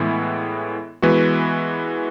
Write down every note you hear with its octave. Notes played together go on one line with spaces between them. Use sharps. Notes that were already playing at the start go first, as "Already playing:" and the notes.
Already playing: A2 E3 G#3 B3 E4
E3 G#3 B3 F#4 B4